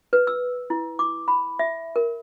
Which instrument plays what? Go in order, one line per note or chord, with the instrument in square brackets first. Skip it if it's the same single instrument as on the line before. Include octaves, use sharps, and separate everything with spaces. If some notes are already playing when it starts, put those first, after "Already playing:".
[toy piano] B4
E6
E4
D6
B5
E5
A#4